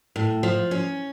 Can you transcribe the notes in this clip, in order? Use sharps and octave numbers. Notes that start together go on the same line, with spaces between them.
A2
F3
C#4